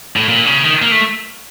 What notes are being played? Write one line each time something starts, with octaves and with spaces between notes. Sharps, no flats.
A2
A#2
C#3
D#3
A#3
A3